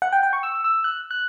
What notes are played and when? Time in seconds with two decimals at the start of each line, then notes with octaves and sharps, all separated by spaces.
0.02 F#5
0.12 G5
0.23 G5
0.33 C#6
0.43 E6
0.64 E6
0.84 F#6
1.11 F#6